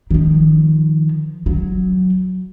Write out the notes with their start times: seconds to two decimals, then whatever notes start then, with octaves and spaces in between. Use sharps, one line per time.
0.11 D#3 F3
1.46 F#3